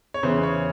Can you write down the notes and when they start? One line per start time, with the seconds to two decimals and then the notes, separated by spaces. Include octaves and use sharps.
0.14 C#5
0.23 E2 C#3 E3 C5
0.43 C#5